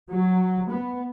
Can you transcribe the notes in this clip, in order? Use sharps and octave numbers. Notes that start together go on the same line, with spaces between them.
F#3
B3